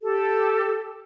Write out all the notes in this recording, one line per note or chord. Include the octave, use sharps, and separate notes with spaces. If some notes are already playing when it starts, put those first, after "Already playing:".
G4 A4